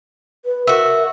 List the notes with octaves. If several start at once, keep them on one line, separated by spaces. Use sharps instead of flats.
B4
F#4 A#4 E5